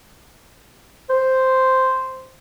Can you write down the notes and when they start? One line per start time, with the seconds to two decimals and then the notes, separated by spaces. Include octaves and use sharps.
1.09 C5